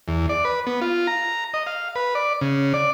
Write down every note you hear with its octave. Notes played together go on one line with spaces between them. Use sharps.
E2
D5
B4
B3
F4
A#5
D#5
F5
B4
D5
C#3
D5